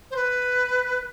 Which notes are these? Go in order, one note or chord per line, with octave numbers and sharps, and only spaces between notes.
C5
B4